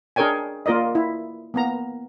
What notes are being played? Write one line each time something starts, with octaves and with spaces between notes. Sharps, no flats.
D4 G#4 A#4 C#5 G5 G#5
A#3 F4 A#4 D5 D#5
E4
A#3 B3 A#5